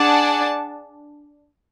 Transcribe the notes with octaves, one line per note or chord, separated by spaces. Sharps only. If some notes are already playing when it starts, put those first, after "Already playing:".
Already playing: D4 G#4 D5 F#5 A5